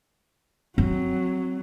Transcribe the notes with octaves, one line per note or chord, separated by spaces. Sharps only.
F#3 C4